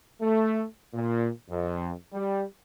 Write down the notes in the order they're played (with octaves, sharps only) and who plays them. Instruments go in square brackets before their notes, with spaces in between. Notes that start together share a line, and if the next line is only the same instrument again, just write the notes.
[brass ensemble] A3
A#2
F2
G3